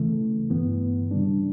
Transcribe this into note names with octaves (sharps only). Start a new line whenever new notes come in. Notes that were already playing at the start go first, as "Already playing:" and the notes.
Already playing: C#3 E3 A3
G2 E3 B3
C#3 G3 D4